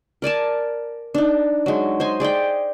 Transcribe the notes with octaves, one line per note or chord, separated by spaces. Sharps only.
A#4 D5 G#5 A5
D4 D#4
F#3 G#3
C5 D#5 G#5
G#4 D5 D#5 G5